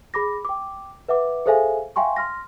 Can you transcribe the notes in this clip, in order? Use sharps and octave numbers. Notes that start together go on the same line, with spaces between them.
G#4 B5 D6 A#6
G5 D6
B4 E5 F#5 D6
G#4 A4 C5 E5 F5 G#5
E5 F5 G5 G#5 C6 C#6
C6 F6 A#6